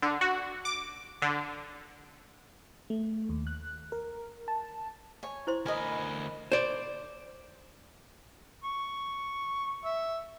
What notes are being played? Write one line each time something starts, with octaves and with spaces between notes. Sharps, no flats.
D3
F#4
D6
D3
A3
D#2
F#6
A#4
A5
C#5 G#5
E4 C5 C6
D2 A#4 B4 D#5 G#5
C5 D5
C#6
E5